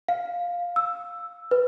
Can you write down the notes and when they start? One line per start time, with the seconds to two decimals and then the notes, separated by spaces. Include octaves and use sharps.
0.08 F5
0.76 E6
1.51 B4